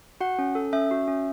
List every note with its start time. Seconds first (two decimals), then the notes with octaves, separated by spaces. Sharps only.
0.21 F#4 F#5
0.39 C#4
0.55 A4
0.73 C#4 E5
0.91 F#4
1.08 C#4